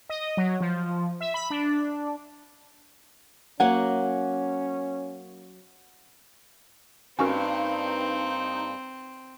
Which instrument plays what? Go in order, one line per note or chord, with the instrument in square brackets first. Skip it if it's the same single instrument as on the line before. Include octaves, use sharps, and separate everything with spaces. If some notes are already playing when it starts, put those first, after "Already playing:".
[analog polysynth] D#5
F#3
F3
E5
B5
D4
[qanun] F#3 A#3 G#5 [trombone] C#4 [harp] F#5
[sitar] G2 A#3 [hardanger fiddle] C4 [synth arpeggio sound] C#4 F#4 A#4 [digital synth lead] D#4